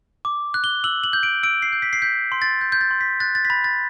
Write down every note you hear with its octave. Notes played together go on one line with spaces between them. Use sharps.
D6
F#6
G7
E6 F#7
F#7
G6
D7
E6 D7
C7
G6
B6
C7
G6 B6
C6
A6
G6
G6
A6
C6
B6
F#6 A6
A6
B6
B5 A6
A6